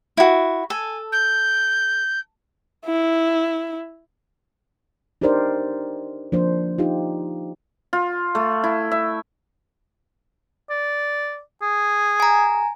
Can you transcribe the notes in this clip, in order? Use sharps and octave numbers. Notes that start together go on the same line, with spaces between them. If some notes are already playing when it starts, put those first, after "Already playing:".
E4 F#4
A4 G#5
G6
E4
D4 D#4 G4 A#4 C5 D5
F3 A#3 D4 C5
D#4 F4 G4
F4
A3
E4
E5
D5
G#4
G#5 A#5